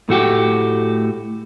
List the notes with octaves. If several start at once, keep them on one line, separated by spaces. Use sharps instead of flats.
A2 A3 F#4 G4